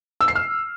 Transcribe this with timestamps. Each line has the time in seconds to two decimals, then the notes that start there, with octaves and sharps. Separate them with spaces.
0.21 E6
0.28 C7
0.35 F6